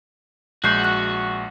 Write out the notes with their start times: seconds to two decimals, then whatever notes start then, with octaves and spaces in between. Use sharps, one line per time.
0.64 A#1 G#3 F#4 F#6 G6 C7
0.84 F#6